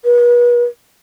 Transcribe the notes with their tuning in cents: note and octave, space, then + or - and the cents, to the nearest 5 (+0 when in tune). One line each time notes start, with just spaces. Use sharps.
B4 -40